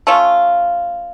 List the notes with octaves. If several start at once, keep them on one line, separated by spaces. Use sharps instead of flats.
A3 C#4 F4